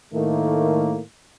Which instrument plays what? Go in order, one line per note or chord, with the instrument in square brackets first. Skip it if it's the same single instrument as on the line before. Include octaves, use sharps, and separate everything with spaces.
[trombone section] A2 D#3 A3 A#3